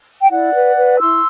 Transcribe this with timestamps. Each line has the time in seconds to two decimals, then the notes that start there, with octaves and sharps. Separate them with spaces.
0.21 G5
0.30 E4 D5 F#5
0.53 B4
0.77 B4
1.00 E4 C6 E6